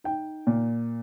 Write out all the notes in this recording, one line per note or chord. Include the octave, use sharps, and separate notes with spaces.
D#4 G5
A#2